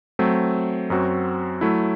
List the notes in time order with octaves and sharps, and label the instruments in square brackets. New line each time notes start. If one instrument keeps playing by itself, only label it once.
[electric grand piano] F#3 A3 C4
F#2 F#3 C4 F#4
F#3 A3 E4